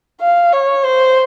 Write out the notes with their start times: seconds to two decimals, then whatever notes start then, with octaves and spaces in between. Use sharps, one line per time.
0.21 F5
0.53 C#5
0.84 C5